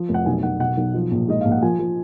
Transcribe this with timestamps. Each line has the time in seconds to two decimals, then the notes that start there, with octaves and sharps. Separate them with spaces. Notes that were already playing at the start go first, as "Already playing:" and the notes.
Already playing: F3
0.09 F1
0.14 F#5
0.26 B1 G#5
0.43 B1 F#5
0.60 B2 F#5
0.77 B1
0.94 F3
1.11 A#1
1.28 G#2 D#5
1.41 A#1 F5
1.52 F#5
1.62 F3 G#5
1.79 F3